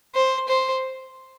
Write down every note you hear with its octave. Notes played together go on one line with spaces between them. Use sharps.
C5
C5